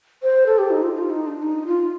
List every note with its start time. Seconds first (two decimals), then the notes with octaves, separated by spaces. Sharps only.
0.23 C5
0.46 A4
0.58 G4
0.70 D#4
0.83 F4
0.95 F4
1.10 D#4
1.27 D4
1.42 D#4
1.67 F4